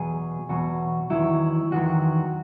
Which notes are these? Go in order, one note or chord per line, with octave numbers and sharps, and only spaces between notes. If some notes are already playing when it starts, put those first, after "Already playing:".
Already playing: E2 B2 F#3 G#4
E2 B2 F#3 F#4
E2 D#3 F#3 E4
E2 D#3 F#3 F#4